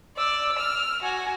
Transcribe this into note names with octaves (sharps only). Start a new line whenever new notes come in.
D5 E6
F6
F#4 G#5